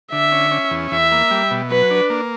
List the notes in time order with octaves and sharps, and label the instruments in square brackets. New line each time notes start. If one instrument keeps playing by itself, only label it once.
[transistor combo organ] D3 [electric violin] E5
[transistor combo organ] C#4
C#4
E2
[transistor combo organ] E2 [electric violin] E5
[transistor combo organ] A#3
G3
B2
[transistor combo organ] F#3 [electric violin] B4
[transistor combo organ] D4
A#3